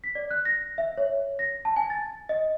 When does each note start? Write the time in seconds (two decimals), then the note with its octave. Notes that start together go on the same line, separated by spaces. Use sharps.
0.04 B6
0.15 D5
0.31 F#6
0.45 A#6
0.78 E5
0.97 C#5
1.39 A#6
1.65 A5
1.76 G#5
1.90 A6
2.29 D#5